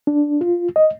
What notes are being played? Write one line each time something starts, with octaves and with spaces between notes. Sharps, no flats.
D4
F4
D#5